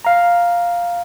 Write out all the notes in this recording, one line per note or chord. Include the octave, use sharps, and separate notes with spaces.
F5 A#5